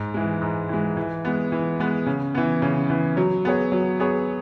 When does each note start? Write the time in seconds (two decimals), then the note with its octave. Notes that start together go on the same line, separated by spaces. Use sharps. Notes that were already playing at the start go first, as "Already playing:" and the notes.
Already playing: G#2
0.14 E3 G#3
0.41 G#2
0.69 E3 G#3
0.97 E3
1.25 G#3 B3
1.52 E3
1.80 G#3 B3
2.06 C#3
2.35 E3 B3
2.62 C#3
2.90 E3 B3
3.17 F#3
3.45 B3 G#4 C#5
3.72 F#3
4.00 B3 G#4 C#5